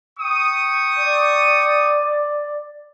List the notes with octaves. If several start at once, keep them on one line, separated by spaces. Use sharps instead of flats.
G5 C#6 D#6
D5